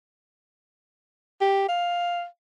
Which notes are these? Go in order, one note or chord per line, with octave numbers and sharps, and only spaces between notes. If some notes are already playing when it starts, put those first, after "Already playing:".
G4
F5